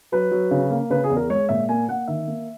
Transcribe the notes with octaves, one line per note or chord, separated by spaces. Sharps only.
F#3 B4
F#3
C#3
A#3
C#3 B4
G#4
E2
A#4
G#3 C#5
A#2 E5
A#3 G#5
A#3 F#5
D#3 E5
A#3